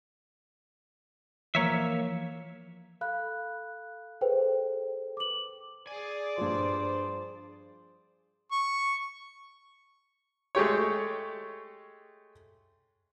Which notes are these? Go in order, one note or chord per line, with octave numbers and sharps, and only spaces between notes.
E3 F3 A#3 C#5 E5
A4 F5 B5 F#6
G#4 A4 B4 C5 G5
D6 F#7
G#4 D5 G#5
G2 F3 C5
C#6
G#3 A3 G4 C#5